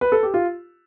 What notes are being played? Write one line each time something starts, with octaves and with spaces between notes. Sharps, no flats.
B4
A4
G4
F4